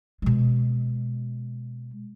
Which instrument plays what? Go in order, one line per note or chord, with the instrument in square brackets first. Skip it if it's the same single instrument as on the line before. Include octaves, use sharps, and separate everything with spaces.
[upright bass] B2 G#3